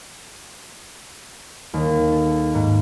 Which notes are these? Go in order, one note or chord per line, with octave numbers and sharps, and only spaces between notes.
D#2
A4
G#2